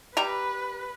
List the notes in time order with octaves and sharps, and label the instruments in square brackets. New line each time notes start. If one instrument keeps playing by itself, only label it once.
[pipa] G3 A#5 [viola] B4